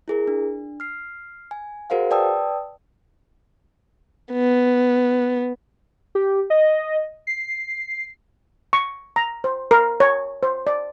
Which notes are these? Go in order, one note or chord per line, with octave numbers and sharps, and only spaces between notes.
E4 G#4 A#4
D4
F6 C7
G#5
F#4 G#4 A#4 C5 F5 F#5
B4 D5 G5 A5 D#6 E6
B3
G4
D#5
C7
C#6
A#5
C5
A#4
C#5
C5
D5